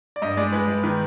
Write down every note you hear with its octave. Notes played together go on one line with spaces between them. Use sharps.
D5
G2 D#5
G#3 D5
G#3 B4
G#3
D#3 B4